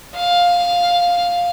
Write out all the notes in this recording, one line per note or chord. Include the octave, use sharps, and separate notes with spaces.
F5